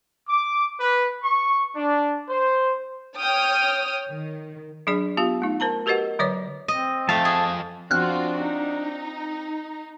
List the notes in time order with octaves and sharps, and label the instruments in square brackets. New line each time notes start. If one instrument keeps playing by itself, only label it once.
[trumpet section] D6
B4
C#6
D4
C5
[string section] C#5 G5 D#6 F6
D#3
[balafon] F#3 D4 G#4 D5
B3 F4 G4 F5
A3 D#4
A#4 C5 A5 A#5
F#4 G4 A#4 B4 D#5 F#5
D3 F#3 B4 C#5 D5 D6
[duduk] C4 [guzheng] D#5
[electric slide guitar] F3 A4 [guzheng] A3 F5 [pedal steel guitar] A5
[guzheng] G#4
[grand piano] F3 C4 [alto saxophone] D4 [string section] F4 F#4 [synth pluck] F6 F#6
[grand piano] C4 F4 [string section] D#4